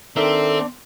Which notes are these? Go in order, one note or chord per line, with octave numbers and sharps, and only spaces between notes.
D#3 C4 D4 A4 A#4 D5 E5